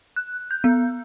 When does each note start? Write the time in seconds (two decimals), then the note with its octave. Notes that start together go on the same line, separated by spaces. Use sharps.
0.16 F#6
0.51 G6
0.64 B3